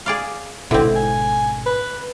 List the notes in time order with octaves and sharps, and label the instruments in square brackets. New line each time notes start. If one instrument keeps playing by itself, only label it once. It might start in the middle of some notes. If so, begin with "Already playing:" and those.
[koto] G#4 D5 F5
[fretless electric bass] G#1 B2 [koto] D3 C4 [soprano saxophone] E4
[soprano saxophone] G#5
B4